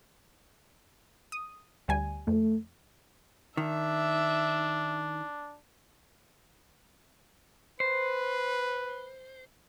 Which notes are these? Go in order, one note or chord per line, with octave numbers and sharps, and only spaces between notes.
D#6
D2 G3 G#5
F2 A3
D#3 D4 E5
B4 C5